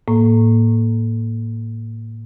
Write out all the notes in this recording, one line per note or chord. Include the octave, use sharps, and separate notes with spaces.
A2 A#3